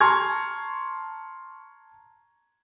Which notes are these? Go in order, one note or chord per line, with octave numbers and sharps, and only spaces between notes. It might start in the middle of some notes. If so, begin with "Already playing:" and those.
A5 A#5 C6 C#6 F6 G#6